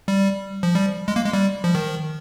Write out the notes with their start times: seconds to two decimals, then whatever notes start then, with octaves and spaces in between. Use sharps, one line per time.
0.08 G3
0.63 F3
0.75 G3
1.08 G#3
1.16 A#3
1.25 G#3
1.33 G3
1.64 F3
1.75 D#3